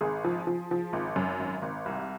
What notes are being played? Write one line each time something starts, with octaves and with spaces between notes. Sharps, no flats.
G#1 G#4
F3
F3
F3
G#1
F#2
G#1
G#1
C2